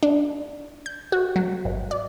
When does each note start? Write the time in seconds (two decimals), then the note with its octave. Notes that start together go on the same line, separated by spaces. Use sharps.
0.03 D4
0.86 G6
1.12 F#4
1.36 F#3
1.65 G#1
1.91 D5